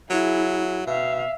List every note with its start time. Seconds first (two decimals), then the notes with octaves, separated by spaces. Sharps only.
0.10 F#3 E4 G#4
0.87 B2 E5 F5